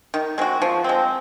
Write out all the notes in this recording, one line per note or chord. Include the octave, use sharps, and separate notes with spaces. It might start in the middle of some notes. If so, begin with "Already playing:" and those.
D#3
G#3 C4 F#4
F3
G#3 C4